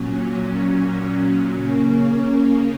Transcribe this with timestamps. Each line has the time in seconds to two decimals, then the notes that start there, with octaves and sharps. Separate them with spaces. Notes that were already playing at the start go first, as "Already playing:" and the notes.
Already playing: A#2 F#3 C#4
1.52 C#3 A#3 C#4